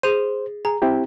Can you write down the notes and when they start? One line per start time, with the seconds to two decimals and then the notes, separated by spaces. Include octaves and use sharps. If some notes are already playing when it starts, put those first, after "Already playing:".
0.03 G#4 C5 D#7
0.65 G#4 A#5
0.82 C4 E4 G4